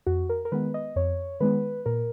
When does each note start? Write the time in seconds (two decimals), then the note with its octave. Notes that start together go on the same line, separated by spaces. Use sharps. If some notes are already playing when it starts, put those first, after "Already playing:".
0.06 F2 F#4
0.29 A#4
0.45 A#4
0.52 D#3 G#3 B3 B4
0.74 D#5
0.96 F2 C#5
1.40 D#3 G#3 B3 B4
1.86 A#2 A#4